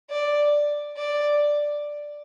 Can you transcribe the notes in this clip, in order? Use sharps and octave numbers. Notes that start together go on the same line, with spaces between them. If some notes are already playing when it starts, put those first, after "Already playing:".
D5
D5